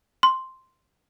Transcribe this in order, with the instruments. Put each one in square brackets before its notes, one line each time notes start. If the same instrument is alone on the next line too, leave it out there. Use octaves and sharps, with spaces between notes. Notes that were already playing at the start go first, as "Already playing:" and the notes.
[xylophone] C6